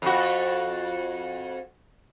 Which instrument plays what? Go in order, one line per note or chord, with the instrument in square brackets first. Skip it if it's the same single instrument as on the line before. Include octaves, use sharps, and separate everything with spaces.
[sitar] F2 F#4